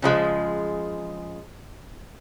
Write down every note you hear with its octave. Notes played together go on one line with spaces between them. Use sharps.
C#3 F3 G#3